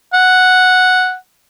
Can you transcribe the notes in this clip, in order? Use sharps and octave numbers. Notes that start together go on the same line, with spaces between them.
F#5